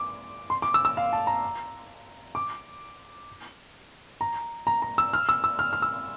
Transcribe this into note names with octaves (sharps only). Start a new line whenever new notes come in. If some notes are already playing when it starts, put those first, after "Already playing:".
Already playing: D6
C6
D6
E6
E6
F5
A5
A#5
D6
A#5
A#5
A#5
E6
F6
E6
E6
F6
F6
E6